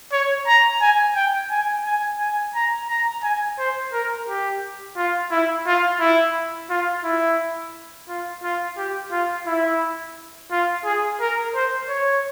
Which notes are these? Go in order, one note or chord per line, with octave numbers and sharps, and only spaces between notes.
C#5
A#5
G#5
G5
G#5
G#5
G#5
A#5
A#5
G#5
C5
A#4
G4
F4
E4
F4
E4
F4
E4
F4
F4
G4
F4
E4
F4
G#4
A#4
C5
C#5